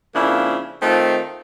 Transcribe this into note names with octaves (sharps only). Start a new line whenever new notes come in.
F2 C#3 F3 A#3 D4 E4
D#3 A3 C4 D#4 F4